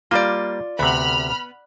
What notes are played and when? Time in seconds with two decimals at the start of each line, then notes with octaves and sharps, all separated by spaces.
0.11 G3 A#3 F4 D5
0.79 D2 C3 B3 B5 F6